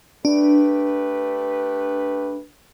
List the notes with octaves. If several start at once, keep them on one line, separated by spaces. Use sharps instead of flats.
A3 D4 G4 B4